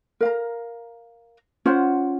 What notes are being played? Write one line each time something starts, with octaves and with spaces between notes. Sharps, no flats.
A#4 F5 A#5
C#4 F4 C5 F#5